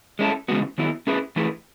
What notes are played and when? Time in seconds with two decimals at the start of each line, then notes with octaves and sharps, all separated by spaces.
0.19 G#3 C#4 E4 A4
0.48 C#3 E3 G#3 B3 F#4
0.78 D#3 F#3 B3 E4
1.07 A3 C#4 E4 G#4 B4
1.36 E3 A3 E4 G#4 B4